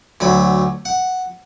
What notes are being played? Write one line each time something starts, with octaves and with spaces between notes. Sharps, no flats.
D2 F#3 B5
F#5